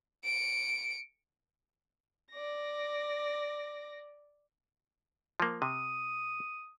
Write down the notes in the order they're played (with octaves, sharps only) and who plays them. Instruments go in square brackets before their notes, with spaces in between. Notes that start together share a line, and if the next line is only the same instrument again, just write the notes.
[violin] C#7 D7
D5 A#6
[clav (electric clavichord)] F3 A#3
[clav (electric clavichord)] C3 [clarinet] D#6